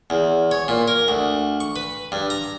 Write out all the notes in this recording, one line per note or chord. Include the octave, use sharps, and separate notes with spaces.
E2
C#5
A#2
A#4
D2
C#6
B4
G2
A#5